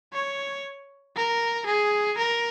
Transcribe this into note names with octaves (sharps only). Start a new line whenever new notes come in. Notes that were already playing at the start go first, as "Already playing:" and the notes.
C#5
A#4
G#4
A#4